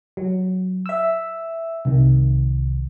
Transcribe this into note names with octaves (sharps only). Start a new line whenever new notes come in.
F#3
E5 E6
C2 D#3